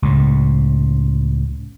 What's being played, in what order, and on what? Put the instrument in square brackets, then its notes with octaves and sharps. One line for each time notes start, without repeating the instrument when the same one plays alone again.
[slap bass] C#2 A2